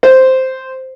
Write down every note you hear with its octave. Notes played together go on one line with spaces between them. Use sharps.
C5